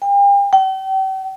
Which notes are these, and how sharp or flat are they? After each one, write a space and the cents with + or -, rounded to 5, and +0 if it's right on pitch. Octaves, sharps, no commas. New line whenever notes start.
G5 +40
G5 -40